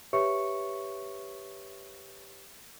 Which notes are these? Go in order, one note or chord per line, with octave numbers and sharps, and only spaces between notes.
G4 B4 C#5 E5 C#6 C#7